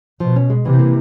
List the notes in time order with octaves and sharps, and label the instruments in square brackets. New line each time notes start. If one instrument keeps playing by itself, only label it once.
[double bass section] B2 [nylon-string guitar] F3
[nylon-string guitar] C#4
G#3
[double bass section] C3 [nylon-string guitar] E3
[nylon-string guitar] A#3